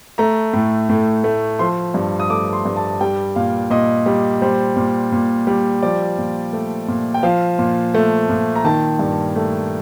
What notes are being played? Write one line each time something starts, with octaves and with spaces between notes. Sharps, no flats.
A3 A#5
A2
A2
A3
F3 C6
G2
D#6
A3 D6
C6
G2
A5
G3 G5
A#2 F5
A#2 D#5
G3
G3 C5
A#2
A#2
G3
F3 D5
A#2
A3
A#2
G5
F3 F5
A#2
A3
A#2
A#5
D#3 A5
G2
A3